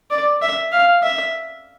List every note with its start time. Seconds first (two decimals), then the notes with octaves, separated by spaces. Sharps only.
0.11 D5
0.42 E5
0.72 F5
1.03 E5